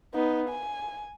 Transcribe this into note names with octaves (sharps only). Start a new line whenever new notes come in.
B3 D#4
G#5